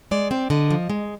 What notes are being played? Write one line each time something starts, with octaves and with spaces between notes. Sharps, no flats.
G#3 D5
C4 D5
D3 D#5
F3
G#3